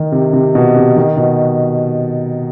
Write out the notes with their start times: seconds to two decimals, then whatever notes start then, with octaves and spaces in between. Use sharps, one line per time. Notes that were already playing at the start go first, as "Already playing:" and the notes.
Already playing: D#3
0.12 C3
0.33 C3
0.55 B2
0.76 C3
0.96 D#3
1.17 B2